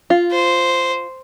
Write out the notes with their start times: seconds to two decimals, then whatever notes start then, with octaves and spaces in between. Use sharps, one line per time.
0.10 F4
0.31 C5